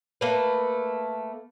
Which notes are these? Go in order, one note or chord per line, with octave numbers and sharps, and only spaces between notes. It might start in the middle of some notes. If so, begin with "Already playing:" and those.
A3 A#3 B4